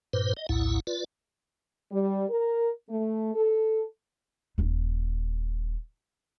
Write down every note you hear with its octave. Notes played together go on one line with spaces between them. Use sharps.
G2 A#2 B4 C5
D#5
A#1 D#2 A2 E4 F#5
F4 B4 D5
G3
A#4
A3
A4
D#1 D#4